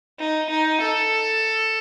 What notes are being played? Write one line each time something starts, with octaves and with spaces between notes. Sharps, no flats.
D#4
D#4
A4